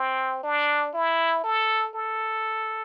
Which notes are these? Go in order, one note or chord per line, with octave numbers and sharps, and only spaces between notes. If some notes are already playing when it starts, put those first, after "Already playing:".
Already playing: C4
D4
E4
A4
A4